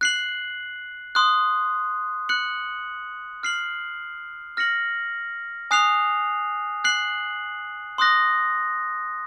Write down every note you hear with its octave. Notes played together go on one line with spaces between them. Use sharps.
F#6 C7 F#7
C6 D#6 F#6
F#6 C#7 F#7
F6 C7 F#7
F6 A#6 C#7 F#7
G#5 D#6 F#6 C7 F7
F#6 C7 F#7
C6 D#6 F#6 A#6